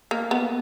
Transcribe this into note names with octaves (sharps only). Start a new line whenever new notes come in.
A#3
B3